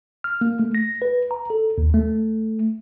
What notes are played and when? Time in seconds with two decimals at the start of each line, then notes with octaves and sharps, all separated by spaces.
0.24 F6
0.41 A#3
0.59 A3
0.75 A#6
1.02 B4
1.31 A#5
1.50 A4
1.78 D#2
1.94 A3